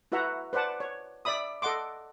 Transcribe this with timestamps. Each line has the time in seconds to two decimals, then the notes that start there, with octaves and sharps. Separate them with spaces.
0.12 E4 F#4 B4 E5 F#5 A#5
0.53 B4 C5 D5 F#5 A5
0.80 C#5
1.25 D5 E5 B5 D#6
1.62 A4 D#5 F#5 C6 D6